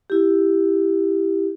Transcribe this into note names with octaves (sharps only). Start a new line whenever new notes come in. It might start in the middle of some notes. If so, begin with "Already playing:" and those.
E4 G4